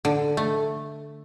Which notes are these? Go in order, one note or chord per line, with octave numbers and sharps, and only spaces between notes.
D3
A3